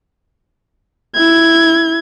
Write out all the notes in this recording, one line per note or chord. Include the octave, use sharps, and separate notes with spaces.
E4 G#6